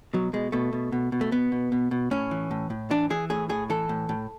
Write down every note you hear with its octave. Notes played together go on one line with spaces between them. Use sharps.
B2 F#3
B2 G#3
B2 A3
B2
B2
B2
A3
B2 B3
B2
B2
B2
A2 C#4
E3
A2
A2
E3 D4
E3 G#4
A2 G#4
A2 G#4
E3 A4
A2
A2